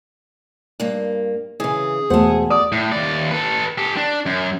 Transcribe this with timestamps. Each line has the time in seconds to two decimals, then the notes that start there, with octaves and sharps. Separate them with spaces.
0.80 G2 A#3
1.60 C#3 E3 G#4
2.10 E1 A3 C5 F#5
2.50 D5 D#6
2.72 A2
2.92 D#2 D5
3.31 A4 B4
3.78 G4 A4
3.97 D4
4.26 F#2